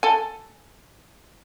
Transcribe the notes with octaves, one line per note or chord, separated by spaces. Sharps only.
A4 G#5